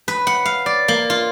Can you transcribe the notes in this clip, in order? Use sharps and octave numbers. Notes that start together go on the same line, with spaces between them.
B4
F#5
F5
D5
A#3
F4